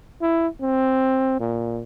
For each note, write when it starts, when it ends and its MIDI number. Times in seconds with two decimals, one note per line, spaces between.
0.21 0.47 64
0.61 1.40 60
1.40 1.83 46